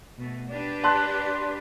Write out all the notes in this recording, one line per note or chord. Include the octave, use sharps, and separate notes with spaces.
B2 A3
D4 G4 B4
A5 C6 F#6